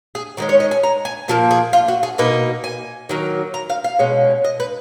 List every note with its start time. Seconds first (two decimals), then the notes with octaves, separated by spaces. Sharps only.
0.15 G#4
0.37 D#3 G#3 C#4 F#4
0.49 C#5
0.60 D#5
0.71 G#5
0.83 A#5
1.05 G#5
1.28 A#2 F3 A#3 A#4
1.51 G#4
1.73 F4
1.88 F#4
2.03 G#4
2.18 B2 A#3 D#4 B4
2.64 G#5
3.09 D#3 F#3 A#3
3.54 A#5
3.70 F5
3.84 F5
3.99 B2 G#3 C#4
4.44 D#5
4.60 B4